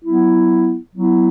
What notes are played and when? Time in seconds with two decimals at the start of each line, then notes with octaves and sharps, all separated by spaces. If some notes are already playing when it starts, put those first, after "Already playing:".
0.03 F#3 B3 E4
0.95 F#3 B3 E4